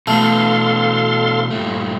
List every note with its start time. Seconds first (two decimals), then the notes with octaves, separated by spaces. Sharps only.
0.07 B2 E3 A3 A4 F5 C6
1.51 G2 A#2 A3